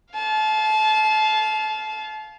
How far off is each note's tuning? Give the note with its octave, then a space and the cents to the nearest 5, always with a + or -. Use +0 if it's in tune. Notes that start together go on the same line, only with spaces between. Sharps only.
F5 +0 A5 -30